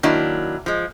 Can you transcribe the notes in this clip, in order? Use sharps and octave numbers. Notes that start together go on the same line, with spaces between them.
D#3 F#3 A#3 D4 E4
F3 G#3